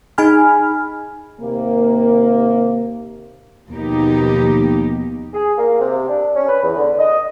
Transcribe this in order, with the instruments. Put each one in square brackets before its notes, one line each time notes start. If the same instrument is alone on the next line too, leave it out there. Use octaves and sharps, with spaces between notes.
[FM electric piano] D#4 G#4 G#5 B5 F6
[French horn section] D#2 C3 A#3
[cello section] D#2 B2 F3 A#3 D#4 G4
[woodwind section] G#4
A#3
C3
D4
C#4
B4
E2
D3
D#5